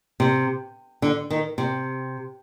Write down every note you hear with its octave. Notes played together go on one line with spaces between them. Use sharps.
C3
D3
D#3
C3